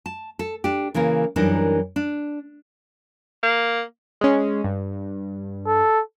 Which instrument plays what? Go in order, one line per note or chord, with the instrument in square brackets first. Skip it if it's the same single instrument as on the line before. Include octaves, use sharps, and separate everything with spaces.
[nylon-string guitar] A5
A4
D4 G4
C#3 E3 A#3 A#4
F#2 E3 G3 D4 D#4 A#4
D4
[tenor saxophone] A#3
[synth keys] G#3 C#4
G2
[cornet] A4